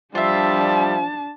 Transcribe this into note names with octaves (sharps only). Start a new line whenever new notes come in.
F3 G3 D4 F4 E5 A5